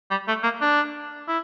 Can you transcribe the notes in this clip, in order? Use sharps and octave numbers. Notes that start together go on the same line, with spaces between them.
G3
A3
A#3
D4
E4